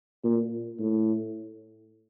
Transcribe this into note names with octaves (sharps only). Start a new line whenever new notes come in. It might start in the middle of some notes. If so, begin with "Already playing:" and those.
A#2
A2